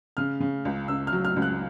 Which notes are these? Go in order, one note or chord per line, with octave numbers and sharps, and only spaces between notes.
C#3 F6
C#3
C#2
C#2 E6
F6
F#3
F6
C#2
F#6